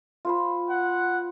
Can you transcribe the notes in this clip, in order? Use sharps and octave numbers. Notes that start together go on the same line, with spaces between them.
F4 C5 B5
F#5